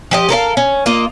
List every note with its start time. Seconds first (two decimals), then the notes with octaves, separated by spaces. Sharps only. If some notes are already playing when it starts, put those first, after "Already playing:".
0.11 F3 G4 D#5
0.29 A4 A#4 C5 F5
0.57 C#4
0.86 A#3 F4 D#5